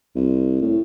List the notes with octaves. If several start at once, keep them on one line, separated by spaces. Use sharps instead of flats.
C2
A2